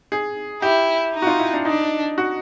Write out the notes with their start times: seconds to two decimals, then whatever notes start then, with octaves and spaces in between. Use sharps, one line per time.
0.12 G#4
0.62 E4 G4
1.15 D#4
1.22 F#4
1.27 F4
1.40 E4
1.54 D4
1.65 D4 D#4
2.18 F#4